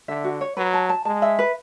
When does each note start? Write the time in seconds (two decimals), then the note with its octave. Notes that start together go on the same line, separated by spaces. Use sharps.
0.08 D3 E5
0.24 F#4
0.41 C#5
0.57 F#3 B4
0.74 A5
0.89 A5
1.05 G#3 A5
1.22 E5
1.39 B4